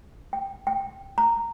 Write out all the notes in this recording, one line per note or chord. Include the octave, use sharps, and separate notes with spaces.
G5
G5
A#5